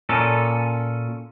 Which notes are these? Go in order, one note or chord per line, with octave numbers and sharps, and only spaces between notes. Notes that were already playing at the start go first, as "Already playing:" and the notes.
A#2 C#4 A4